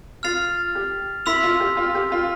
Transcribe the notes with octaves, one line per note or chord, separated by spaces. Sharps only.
F4 F6 A6 C7 F7
G4
E4 C6 E6 B6 F7
F4
G4
F4
G4
F4